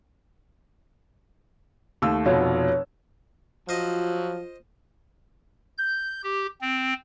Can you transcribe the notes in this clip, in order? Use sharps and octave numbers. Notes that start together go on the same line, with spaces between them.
D#2 A3 E6
F1 B2 F4 C#5
F3 F#3 F4 C5 D#5
G6
G4
C4